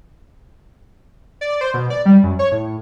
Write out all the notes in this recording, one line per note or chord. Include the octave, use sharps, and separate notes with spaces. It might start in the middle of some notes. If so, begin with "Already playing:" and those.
D5
C5
B2
D5
G3
F#2
C#5
A2